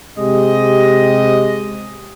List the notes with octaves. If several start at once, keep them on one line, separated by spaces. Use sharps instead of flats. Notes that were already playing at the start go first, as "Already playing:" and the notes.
C3 G#3 G4 D#5